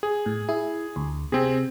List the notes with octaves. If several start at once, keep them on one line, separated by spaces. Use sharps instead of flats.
G#4
A2
E4 G#4
D2
C3 C4 G#4